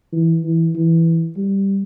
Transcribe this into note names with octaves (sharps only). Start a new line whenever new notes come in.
E3
E3
E3
G3